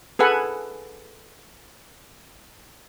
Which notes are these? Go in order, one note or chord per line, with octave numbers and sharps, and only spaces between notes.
G#4 A4 B4 F#5 G#5